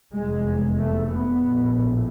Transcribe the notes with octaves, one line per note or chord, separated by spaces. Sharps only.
F1 E2 C3 G#3
A3
B3
A#1 A2